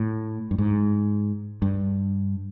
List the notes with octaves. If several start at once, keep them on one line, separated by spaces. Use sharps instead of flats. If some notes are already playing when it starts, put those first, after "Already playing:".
Already playing: A2
G2
G#2
G2